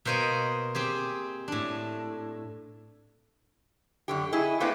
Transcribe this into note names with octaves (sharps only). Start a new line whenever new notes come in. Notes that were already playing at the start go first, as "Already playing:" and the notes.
B2 A#3 C5 C#5 D#5
C4 G4 G#4
A2 D4
F#2 D3 G4
E4 G#4 D#5
A3 A#3 C4 D4 B4 D#5